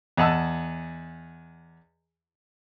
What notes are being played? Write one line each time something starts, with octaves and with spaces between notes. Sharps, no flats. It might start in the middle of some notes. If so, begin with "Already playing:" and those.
E2 D#5 F#5 A5 E6